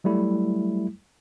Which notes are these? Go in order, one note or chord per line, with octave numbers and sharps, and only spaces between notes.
F#3 G3 A3 E4